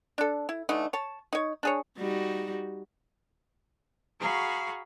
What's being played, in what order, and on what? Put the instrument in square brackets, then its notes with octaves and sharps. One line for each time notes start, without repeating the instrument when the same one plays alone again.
[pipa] D4 A4
E4
D3 E3 A3 D#4
C#5 A5
D#4 C#5
D4 G#4 C#5
[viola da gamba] G3 D#4 F#4
[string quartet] F#4 G#4 F5 A#5 B5 C#6